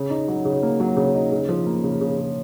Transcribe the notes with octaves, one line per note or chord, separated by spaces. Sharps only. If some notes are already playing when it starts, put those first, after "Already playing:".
Already playing: C#3
D#4
F#3
C#3
A#3
F#3
C#3
D#4
C#3
F3
A#3
C#3
C#3
C#3